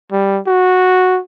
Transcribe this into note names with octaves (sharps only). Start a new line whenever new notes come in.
G3
F#4